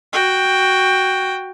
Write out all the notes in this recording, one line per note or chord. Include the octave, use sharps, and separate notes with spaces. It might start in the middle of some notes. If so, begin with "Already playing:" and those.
F#4 G5